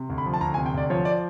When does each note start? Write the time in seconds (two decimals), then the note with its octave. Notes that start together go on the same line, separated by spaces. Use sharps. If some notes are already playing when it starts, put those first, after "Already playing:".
Already playing: C3
0.10 D2
0.18 B5
0.26 F3
0.34 A5
0.41 D2 A#5
0.54 G#5
0.58 C3
0.66 G5
0.74 D2 D5
0.90 F3 C#5
1.05 D5